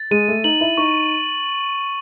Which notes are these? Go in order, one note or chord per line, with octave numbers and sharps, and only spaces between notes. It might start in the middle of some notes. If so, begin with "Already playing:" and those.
Already playing: A6
G#3 D#7
A3
D#4 F#7
E4
D#4 C#6